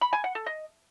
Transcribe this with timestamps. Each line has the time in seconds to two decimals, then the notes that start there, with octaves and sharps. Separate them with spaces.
0.01 B5
0.13 G#5
0.24 F#5
0.35 A4
0.46 D#5